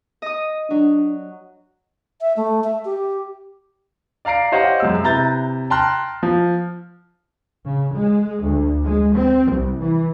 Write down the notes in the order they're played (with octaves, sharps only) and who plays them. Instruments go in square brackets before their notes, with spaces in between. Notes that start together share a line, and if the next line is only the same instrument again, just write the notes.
[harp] D#5 D#6
[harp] F#3 [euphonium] D4
[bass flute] E5
A3
E5
G4
[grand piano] D5 F5 A#5 C7 D7
G4 C5 C#5 D#5 F5 F#5
F#2 G#3 E6
C3 E4 B4 A#5 G6 A6
G5 A5 A#5 C6 F6 F#6
F3
[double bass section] C#3
G#3
D2
G#3
C4
C2
E3